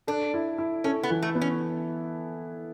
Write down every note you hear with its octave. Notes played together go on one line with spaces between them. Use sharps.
D4 A4
E4
E4
C#4 A4
B3
E3
A3
B3
C#4